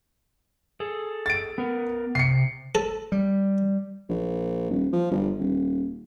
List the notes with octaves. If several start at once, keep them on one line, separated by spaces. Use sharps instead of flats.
G#4 A4
A6 D7
B3 A#4
C3 C7 C#7
A4
G3
A#1
D#1
F3
G1
D#1